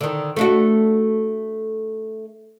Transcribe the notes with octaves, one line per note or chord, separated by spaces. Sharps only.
D3 D#3
A3 D4 F#4